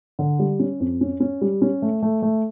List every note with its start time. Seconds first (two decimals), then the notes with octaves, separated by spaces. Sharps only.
0.19 D3
0.39 G3
0.60 C#4
0.80 F2
1.01 C#4
1.20 C#4
1.41 G3
1.62 C#4
1.82 A3
2.03 A3
2.22 A3